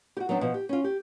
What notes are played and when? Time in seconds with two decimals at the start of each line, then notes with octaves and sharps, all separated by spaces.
0.17 F#4 G4
0.29 F#3 B3 C4 D4
0.41 B2 F3
0.54 G4
0.69 C#4 F4
0.84 G4